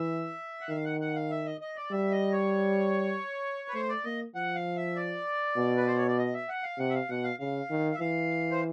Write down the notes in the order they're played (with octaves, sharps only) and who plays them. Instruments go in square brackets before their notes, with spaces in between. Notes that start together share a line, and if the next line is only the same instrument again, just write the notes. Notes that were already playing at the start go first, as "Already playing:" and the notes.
Already playing: [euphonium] E3 [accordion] E5
[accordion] F#5
[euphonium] D#3 [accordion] F5
[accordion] F#5
F#5
F5
E5
D#5
D#5
D5
[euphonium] G3 [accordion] E5
[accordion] D#5
C#5
B4
[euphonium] A3 [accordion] C5
[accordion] D5
[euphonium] A#3 [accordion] D#5
[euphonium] F3 [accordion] F#5
[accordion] F5
E5
D5
[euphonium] B2
[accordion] B4
C5
C#5
D5
D#5
E5
F#5
F5
[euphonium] C3 [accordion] F#5
[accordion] E5
F5
[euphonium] B2 [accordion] F#5
[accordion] F5
[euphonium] C#3 [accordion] F5
[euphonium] D#3
[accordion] E5
[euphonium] E3 [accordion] F5
[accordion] C5